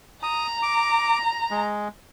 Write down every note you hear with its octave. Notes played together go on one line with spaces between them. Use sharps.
A#5 D#6
D6
G#3